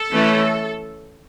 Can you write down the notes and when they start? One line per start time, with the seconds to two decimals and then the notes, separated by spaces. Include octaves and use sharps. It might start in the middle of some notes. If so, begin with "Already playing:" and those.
Already playing: A4
0.12 E3 A3 C#4